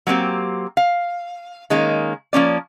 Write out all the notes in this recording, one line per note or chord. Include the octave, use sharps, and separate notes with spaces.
F#3 A#3 C4 G4
F5
D#3 G#3 A#3 C#4
F3 A#3 C#4 D5